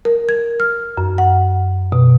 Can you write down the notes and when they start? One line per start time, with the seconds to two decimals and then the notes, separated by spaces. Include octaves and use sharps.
0.05 A#4
0.29 G#6
0.60 F6
0.97 F#2
1.18 F#5
1.92 B2